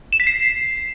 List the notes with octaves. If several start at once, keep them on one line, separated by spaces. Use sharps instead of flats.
E7
B6
C7